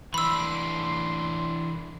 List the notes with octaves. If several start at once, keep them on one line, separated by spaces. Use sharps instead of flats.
E3 D4 B5 C6 E6